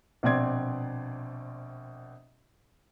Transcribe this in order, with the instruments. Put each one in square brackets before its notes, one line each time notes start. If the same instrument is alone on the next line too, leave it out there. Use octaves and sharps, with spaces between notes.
[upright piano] A#1 B2 C4 D5 C6 G#6